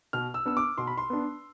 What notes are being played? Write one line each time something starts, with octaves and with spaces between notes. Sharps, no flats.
B2 F6
E6
B3 D4 E6
D6
B2 C6
B5
C6
B3 D4